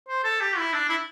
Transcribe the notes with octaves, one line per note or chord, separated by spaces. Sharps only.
C5
A4
G4
E4
D4
E4